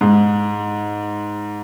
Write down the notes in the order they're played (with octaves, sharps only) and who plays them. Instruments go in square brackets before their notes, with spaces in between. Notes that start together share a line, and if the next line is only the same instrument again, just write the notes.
[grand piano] G#2